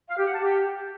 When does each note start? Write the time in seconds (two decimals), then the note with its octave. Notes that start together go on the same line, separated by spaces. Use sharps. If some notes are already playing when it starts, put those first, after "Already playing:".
0.09 F5
0.18 G4
0.26 F#5
0.34 A5
0.43 G4